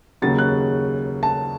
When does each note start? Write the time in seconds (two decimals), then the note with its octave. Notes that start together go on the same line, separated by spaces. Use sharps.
0.22 D#2 C#3 F#3 A6
0.39 F#6
1.23 A5